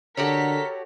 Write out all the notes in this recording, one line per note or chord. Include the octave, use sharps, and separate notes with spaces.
D3 F#4 G4 A4 A#4 C#5 B6